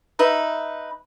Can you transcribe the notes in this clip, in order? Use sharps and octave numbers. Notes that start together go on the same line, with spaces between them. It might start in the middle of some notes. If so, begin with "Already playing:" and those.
D#4 B4 E5